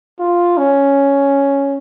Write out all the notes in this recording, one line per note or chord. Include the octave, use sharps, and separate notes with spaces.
F4
C#4